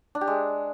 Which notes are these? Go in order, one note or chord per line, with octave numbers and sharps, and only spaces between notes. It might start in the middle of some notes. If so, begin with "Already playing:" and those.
D4
G4
G#3